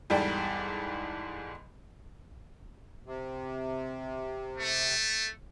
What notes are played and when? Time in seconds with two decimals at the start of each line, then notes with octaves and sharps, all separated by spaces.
0.10 E2 G#2 G3 A4 D5 G5
3.06 C3
4.58 A3